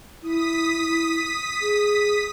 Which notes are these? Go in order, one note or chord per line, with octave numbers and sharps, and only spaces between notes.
E4 D#6 B6
G#4